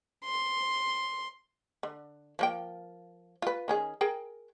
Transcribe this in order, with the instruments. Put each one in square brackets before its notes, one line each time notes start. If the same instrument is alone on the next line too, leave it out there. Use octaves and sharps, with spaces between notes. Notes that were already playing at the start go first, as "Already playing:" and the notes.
[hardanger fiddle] C6
[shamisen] D3
F3 A#3 G5
F4 B4
D#3 C#4 G#4
G#4 A#4 G5